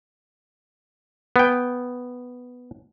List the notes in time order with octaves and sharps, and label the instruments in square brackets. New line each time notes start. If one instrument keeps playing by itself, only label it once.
[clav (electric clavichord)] B3 G5